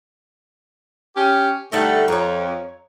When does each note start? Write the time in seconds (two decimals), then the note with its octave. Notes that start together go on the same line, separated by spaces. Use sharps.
1.15 C#4 G4
1.72 D3 G3 A3 D#4 A4 F#5
2.08 F2 C#5 A#5